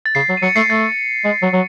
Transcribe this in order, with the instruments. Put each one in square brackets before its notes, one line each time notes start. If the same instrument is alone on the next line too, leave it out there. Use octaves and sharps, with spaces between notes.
[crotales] A6
[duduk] C#3 [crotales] C7
[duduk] F#3
[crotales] D#7
[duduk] F#3 [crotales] C#7
[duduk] A3 [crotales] C7
[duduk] A3 [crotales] A6
[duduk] G#3
F#3
F#3